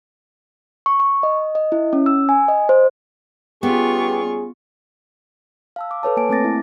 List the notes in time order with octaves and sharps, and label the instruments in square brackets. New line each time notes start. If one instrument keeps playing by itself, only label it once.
[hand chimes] C#6
C#6
D#5
D#5
E4
C#4
E6
G#5
D#5
C5
[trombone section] G3 C#4 G#4 [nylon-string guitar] B3 [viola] F4 C#6 [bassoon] G4
[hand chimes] F5 A5 E6
D6
A4 B4 C#5 A5
A#3 G#5 A5 D7
A3 C4 D6 A6 A#6
E4